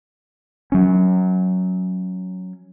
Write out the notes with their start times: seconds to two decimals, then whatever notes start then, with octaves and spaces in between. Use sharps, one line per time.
0.72 F#3 C#4